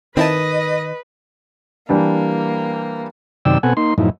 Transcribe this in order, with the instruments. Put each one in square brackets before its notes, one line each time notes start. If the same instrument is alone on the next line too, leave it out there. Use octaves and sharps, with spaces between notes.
[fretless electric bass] D#3 [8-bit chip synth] C4 E4 A5 [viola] B4 [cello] D#5
[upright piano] E3 G3 D4 [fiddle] A#3
[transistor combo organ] F#2 C3 D#3 D5 G5 E6
B2 B3 C4 A4 F#5 G#5
A#3 D#4 C6
F#2 A2 F3 D#4 E4